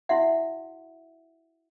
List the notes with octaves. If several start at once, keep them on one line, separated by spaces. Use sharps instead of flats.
E4 F#4 E5 F#5